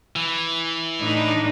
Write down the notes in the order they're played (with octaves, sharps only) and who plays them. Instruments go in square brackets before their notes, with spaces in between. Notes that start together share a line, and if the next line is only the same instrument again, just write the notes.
[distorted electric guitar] E3
[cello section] A2 D4 D#4